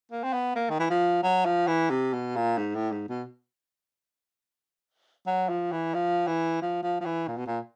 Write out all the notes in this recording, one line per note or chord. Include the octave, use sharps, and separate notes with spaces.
A#3
C4
B3
A#3
D#3
E3
F3
F#3
F3
E3
C3
B2
A#2
G#2
A2
G#2
B2
F#3
F3
E3
F3
E3
F3
F3
F3
E3
A#2
B2
A#2